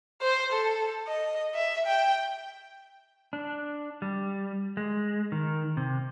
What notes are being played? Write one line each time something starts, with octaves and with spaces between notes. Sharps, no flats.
C5
A4
D#5
E5
G5
D4
G3
G#3
D#3
C3